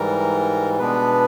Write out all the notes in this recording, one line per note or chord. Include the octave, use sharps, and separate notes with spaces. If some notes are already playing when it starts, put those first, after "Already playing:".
Already playing: G#2 E3 G3 A#4
B2 G#3 B3 D4 B4